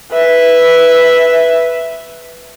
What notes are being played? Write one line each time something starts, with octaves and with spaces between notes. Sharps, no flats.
B4 E5